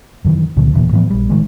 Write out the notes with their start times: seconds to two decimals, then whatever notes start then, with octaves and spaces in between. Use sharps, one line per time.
0.25 F#2 D#3 E3
0.56 C#2 A#2 D3 F3
0.74 E1 A#2 E3 A#3
0.92 A2 E3 F3 B3
1.10 A#1 G3
1.30 A1 D#3 G#3